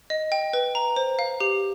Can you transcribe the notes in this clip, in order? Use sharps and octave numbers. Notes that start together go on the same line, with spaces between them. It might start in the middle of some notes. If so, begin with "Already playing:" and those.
D#5
G5
B4
A#5
C5
F5
G4